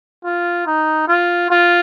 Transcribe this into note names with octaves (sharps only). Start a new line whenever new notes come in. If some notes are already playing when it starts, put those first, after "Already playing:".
F4
D#4
F4
F4